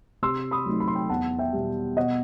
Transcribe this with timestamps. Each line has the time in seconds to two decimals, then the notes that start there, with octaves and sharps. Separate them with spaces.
0.22 C3 C6 E6
0.51 B5 D#6
0.66 F#3 A3 D#4
0.80 B5
0.87 C6
0.95 G5 B5
1.09 E2 F#5 A5
1.39 E5 G5
1.53 B2 G3
1.97 B2 D#5 F#5